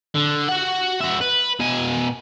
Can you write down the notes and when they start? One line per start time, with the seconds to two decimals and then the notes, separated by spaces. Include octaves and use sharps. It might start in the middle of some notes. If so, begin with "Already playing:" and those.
0.15 D3
0.48 F#4 F#5
1.00 F#4 E5
1.21 B4
1.60 B2 G#5